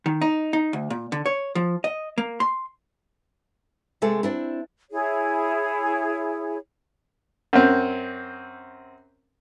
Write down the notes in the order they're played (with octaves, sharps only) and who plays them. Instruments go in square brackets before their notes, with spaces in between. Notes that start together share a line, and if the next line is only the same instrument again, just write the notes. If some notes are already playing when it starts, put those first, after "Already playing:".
[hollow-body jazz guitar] D#3
D#4
D#4
D2
A#2
D3
C#5
F3
D#5
A#3
C6
[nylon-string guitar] C3 G#3 A3 A4
C4 D4 E4
[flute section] E4 G#4 C#5
[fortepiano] F#2 C4